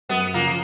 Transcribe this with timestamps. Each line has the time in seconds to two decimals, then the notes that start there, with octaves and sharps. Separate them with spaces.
0.09 F#2 B3
0.34 C#3 F3 A#3